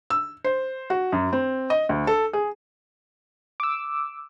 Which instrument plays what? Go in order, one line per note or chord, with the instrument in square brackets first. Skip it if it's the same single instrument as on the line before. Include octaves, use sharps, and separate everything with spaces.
[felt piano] E6
C5
F#4
F#2
C4
D#5
D2
A4
G#4
[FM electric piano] D6 E6